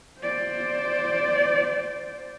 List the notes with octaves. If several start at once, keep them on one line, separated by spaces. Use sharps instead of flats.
C5 D5